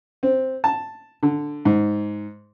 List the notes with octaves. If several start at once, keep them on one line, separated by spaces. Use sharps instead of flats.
C4
A5
D3
G#2